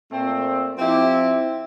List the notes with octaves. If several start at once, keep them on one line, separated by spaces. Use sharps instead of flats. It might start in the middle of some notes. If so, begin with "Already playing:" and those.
A#2 A3 C4
F3 C4 E4 G4